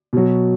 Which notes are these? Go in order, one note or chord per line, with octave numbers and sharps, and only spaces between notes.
B2 F#3